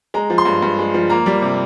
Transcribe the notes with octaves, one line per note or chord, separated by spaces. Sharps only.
G#3 A#5
F3
C6
G2
G2
G#3
F3
A#3 A#5
G3
C3